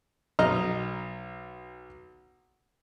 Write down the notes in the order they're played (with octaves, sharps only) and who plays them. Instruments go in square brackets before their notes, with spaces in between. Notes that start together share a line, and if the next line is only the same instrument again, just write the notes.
[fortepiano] B1 D#5 A#5 F6